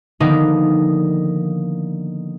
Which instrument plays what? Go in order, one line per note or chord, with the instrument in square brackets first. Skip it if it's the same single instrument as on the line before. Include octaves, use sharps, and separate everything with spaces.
[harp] D3 D#3 F3 A#3 B3 D#4